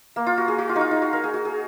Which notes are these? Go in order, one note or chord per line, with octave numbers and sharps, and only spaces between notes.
A#3
F4
F#4
G#4
F#4
F4
D#4
F4
D#4
F#4
A#4
G#4
F#4
G#4